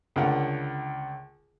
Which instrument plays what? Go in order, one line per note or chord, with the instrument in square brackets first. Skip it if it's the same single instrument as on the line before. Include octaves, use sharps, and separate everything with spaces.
[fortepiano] C#2 D3 A3 A#4 C#5 F#5